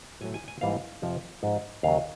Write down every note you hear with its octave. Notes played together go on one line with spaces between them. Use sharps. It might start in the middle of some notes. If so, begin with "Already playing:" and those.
A2 F#3 A3 G#5
G#5
G#5
G#2 E3 G3 A#3 F5
F2 C3 F3
G#2 F3 G#3
D#2 C#3 F#3 F5